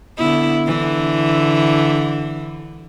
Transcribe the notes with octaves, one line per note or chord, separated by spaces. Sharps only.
D3 B3 E4
D3 E3